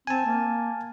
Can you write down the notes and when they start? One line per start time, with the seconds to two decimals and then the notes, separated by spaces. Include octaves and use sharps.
0.07 C4 G#5 A5
0.26 A#3